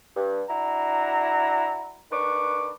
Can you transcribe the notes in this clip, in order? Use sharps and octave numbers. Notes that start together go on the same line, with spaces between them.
G2
D4 E4 F#4 A#5
D#3 D4 B4 C#6 D6